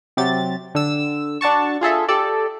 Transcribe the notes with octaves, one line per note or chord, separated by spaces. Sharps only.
C3 F#3 G4 A6
D3 E6
D4 F#4 A5 C#6
F4 G#4 A4 E5
G4 A4 D5